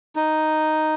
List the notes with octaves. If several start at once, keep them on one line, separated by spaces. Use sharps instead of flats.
D#4